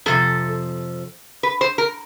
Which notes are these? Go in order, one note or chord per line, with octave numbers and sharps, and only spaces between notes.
F2 C3 F3 A4
B4
C5
A#4